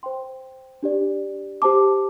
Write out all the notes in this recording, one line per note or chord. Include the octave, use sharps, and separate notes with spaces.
C5 G5 C6
D4 G4 D5
G4 C5 A5 D6